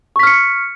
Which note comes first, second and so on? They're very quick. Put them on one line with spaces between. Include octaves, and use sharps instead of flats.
C#6 B6 F6 C#7